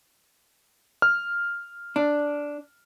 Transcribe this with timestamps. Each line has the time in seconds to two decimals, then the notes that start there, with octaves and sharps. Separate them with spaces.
1.02 F6
1.96 D4